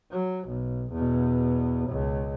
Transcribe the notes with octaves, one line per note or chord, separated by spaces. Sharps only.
F#3
B1
E2 B2
C#2